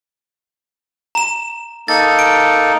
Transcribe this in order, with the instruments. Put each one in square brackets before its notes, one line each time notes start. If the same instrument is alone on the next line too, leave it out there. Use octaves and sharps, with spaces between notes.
[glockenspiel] A#5 E7
[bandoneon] A#3 D#4 A4 [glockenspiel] A6
[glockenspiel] D7